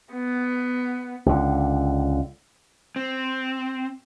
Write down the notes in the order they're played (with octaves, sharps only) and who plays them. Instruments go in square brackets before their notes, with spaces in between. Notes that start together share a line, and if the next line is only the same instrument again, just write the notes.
[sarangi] B3
[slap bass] C#2 D3
[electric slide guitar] C4